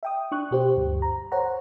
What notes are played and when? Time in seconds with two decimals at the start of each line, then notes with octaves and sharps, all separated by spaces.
0.03 E5 G5 D#6
0.32 D4 C#6 F#6
0.51 B2 G4 C5
0.76 D2 G2
1.02 A#5
1.32 C5 C#5 F#5 A#5